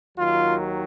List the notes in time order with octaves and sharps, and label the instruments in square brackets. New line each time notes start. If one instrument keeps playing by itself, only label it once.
[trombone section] D#2 D#3 F#3 F4